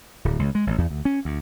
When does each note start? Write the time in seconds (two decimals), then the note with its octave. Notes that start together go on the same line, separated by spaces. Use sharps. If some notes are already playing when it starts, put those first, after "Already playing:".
0.25 D1
0.39 C#2
0.55 G#3
0.67 A1
0.78 E2
0.90 D2
1.05 C#4
1.25 D2